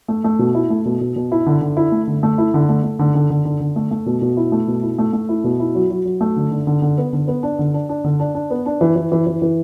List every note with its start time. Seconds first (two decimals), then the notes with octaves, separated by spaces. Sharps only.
0.08 A3
0.24 A3
0.39 B2
0.55 E4
0.70 A3
0.85 B2
1.01 B2
1.16 B2
1.32 E4
1.46 D3
1.61 D3
1.77 E4
1.92 A3
2.07 D3
2.23 A3
2.38 E4
2.54 D3
2.69 A3
2.84 A3
2.99 D3
3.15 D3
3.30 D3
3.45 D3
3.60 D3
3.76 A3
3.91 A3
4.06 B2
4.22 B2
4.37 E4
4.52 A3
4.68 B2
4.83 E4
4.98 A3
5.13 A3
5.29 E4
5.44 B2
5.60 E4
5.75 F#3
5.90 F#3
6.05 F#3
6.21 A3
6.36 D3
6.51 D3
6.67 D3
6.82 D3
6.98 B3
7.13 D3
7.28 B3
7.43 D4
7.59 D3
7.74 D4
7.89 D4
8.04 D3
8.19 D4
8.35 D4
8.50 B3
8.66 D4
8.81 E3
8.96 E3
9.12 E3
9.27 E3
9.42 E3